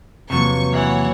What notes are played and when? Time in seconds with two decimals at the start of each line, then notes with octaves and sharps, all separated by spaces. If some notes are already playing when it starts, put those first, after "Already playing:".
0.30 E2 C3 F3 F#3 A#3 C#6
0.72 E3 C#5 F#5